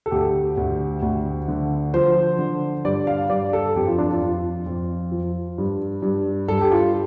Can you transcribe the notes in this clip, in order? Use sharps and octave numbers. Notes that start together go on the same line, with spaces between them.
A4
D2 G4
D2
D2
D3
F3 C5
D3
G2 D5
F5
G2 D5
A4
F2 G4
F4
D4
F4
F2
F2
F3
G2
G2
G2 A4
G4
F4